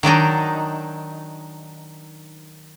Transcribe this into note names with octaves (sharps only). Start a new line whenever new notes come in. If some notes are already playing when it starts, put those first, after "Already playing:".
D#3 F#3 D4 D#4